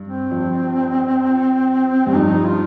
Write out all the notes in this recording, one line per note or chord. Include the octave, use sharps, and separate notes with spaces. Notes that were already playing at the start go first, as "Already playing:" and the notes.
Already playing: G2
C4
F2
G2
F2 D#4
F4